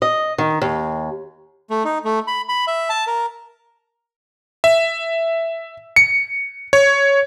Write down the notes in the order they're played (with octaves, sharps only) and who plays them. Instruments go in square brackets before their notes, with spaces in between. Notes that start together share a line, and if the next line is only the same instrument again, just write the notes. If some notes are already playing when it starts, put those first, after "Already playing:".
[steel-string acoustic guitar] D#5
D#3
D#2
[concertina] A3
D#4
A3
B5
B5
E5
A5
A#4
[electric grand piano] E5
C#7
C#5